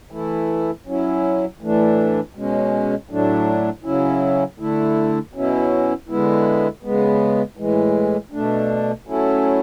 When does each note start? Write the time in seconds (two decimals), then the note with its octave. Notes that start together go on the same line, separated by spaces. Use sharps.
0.11 E3 A3 E4
0.86 F#3 C#4 E4
1.61 A2 E3 A3 D4
2.35 B2 G#3 C#4
3.09 A2 F#3 A3 D4
3.84 C#3 F#3 C#4 E4
4.59 D3 A3 E4
5.34 B2 F#3 C#4 E4
6.09 D3 G#3 B3 E4
6.83 C#3 G#3 B3
7.57 A2 E3 G#3
8.32 B2 A3 D4
9.07 F#3 A3 C#4 E4